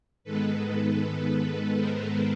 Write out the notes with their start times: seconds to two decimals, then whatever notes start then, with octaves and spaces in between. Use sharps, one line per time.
0.24 G#2 D#3 G#3 B3 A4 B4
1.77 A#4 C5